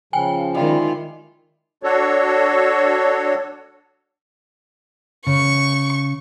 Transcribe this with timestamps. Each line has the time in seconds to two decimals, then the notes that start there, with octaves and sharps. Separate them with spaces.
0.13 C#3 F3 G5 G#5
0.54 D#3 G3 G#3 E4 F4
1.83 D4 F#4 A4 C#5
5.27 C#3 C#6